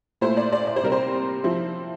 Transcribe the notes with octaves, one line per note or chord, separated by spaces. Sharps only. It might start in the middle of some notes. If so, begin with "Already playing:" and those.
A#2 A3 E4 C5
D5
D5
D5
C5
C3 G3 C4 A#4
C5
F3 C4 E4